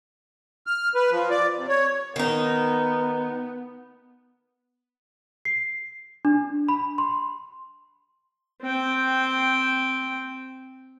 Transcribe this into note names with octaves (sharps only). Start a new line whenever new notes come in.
F6
B4
F3
D5
C3
C#5
D#3 B3 D#4
C7
D4
B5
C6
C4 G5